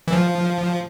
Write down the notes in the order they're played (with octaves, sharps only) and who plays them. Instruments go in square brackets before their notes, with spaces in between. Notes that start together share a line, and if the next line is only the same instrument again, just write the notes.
[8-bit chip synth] E3
F3